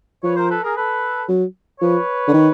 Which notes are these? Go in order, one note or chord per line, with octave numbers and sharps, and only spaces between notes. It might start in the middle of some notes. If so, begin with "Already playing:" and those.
F3 B4 C#5
A#4 C5
A4 B4
G#4 A#4
A4 B4
F#3
F3 B4 C#5
D3
D#3